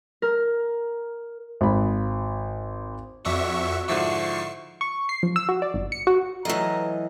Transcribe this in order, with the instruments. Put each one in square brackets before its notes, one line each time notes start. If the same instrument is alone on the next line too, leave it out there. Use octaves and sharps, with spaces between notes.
[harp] A#4
[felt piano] G#1 B5
[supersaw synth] F2 E5 C#6 [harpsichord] D4 [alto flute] F#4
[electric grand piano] G#2 F3 D6 [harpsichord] D3 E4 [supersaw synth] C#6 C7
[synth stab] C#6
C7
F3
E6
F#4
D5
G1
C#7
F#4
[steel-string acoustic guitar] E3 D#5 [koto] F#3 A3 F4 [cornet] A#5